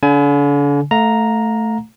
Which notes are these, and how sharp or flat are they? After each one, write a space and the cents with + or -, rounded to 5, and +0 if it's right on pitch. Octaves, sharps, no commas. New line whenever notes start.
D3 -40 G#5 +30
A3 +0 F5 +35 A#5 +0